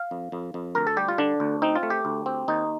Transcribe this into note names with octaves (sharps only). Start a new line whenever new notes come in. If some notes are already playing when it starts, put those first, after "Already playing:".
Already playing: F5
F2
F2
F2
D2 A#4
A4
G3 G4
F4
D3 D4
D2
C4 D#4
F4
A3
G4
D2
C4
D#2 D#4